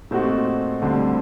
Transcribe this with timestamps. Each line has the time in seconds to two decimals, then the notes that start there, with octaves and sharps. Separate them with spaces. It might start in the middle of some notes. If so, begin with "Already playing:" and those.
0.11 A#2 A3 C4 D#4 F#4
0.82 D2 D3 G3 C4